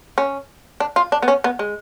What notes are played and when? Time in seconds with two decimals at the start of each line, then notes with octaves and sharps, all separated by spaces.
0.18 C#4
0.80 D4
0.96 F4
1.12 D4
1.23 B3
1.28 C#4
1.44 B3
1.59 G#3